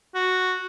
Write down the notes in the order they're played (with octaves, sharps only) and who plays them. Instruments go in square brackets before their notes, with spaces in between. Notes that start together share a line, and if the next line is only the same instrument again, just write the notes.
[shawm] F#4